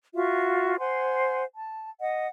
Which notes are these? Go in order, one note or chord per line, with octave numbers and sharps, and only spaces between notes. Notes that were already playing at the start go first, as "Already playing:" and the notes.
F4 F#4 E5
C5 F#5 G#5 C6
A5
D#5 F#5